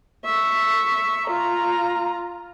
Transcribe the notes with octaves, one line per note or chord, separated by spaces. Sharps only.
E5 C#6
F4 A#5